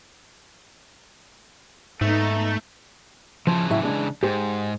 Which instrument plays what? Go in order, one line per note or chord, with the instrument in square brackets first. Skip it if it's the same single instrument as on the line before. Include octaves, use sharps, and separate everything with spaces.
[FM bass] G#2 [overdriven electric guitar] A3 [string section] B3 D#4 A4
[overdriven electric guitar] C#3 E3 [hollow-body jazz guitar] F3
[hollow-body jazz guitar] A2 F#3 E4
G#3 D4
[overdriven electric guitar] G#2 [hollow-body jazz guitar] G4 G#4 C5